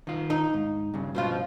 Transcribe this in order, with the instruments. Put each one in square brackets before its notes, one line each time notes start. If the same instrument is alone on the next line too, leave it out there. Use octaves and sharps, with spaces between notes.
[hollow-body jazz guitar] D#3 F4
[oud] D#4
[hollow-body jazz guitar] G#2
G2 C#3
[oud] B2 F3 F4